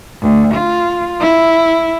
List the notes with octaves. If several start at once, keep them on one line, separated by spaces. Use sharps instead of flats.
D2
F4
E4